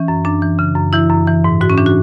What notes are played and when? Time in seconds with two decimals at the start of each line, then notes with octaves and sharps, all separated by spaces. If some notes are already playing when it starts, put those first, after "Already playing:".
Already playing: E3 C#4
0.08 F#2
0.25 F#2 D4
0.42 E3
0.59 C#3
0.75 F#2
0.93 E3 E4
1.10 F#2
1.27 E3
1.44 G#2
1.61 G#2 F#4
1.70 C#4
1.78 E3 D4
1.86 F#4